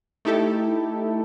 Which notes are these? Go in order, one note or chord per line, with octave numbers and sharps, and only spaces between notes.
A3 D#4 E4 G4 A4